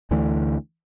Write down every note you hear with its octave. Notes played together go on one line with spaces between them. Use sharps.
D2 D3 E3 A3